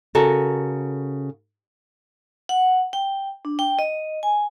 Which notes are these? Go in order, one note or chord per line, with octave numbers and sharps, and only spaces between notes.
C#3 F#4 A4 A#4
F#5
G5
D4
G5
D#5
G#5